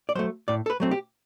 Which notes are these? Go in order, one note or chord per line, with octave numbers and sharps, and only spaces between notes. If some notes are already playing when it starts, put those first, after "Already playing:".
D5
F#3 A3 C5
A2 D5
A4
B4
F#3 A3 C4
G4